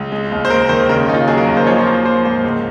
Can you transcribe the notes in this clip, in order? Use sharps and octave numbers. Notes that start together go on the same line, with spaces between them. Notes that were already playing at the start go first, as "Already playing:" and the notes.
Already playing: C#2
G#3
D#2
C5
D#2 A#4
D#3 C5
C#3 A#4
D#2 D#4
F4
F#3 G#4
A#4
D#2
C5
F3 C#5
C5
A#3
F3 C5
G#2 C5
C#2